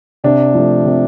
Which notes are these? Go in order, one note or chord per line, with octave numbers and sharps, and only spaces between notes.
C3 D4
F3 A3
C3